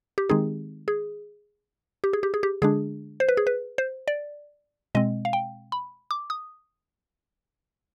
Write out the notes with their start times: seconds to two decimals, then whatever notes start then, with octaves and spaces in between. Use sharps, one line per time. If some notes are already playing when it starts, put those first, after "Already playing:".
0.18 G4
0.30 D#3 G#3 C4 D#4 G#4
0.88 G#4
2.04 G4
2.13 G#4
2.23 G4
2.34 G#4
2.43 G4
2.62 D3 G#3 D4 G#4
3.20 C5
3.29 B4
3.37 G#4
3.47 B4
3.78 C5
4.08 D5
4.95 B2 G#3 C4 D#5
5.25 F5
5.33 G5
5.72 B5
6.11 D6
6.30 D#6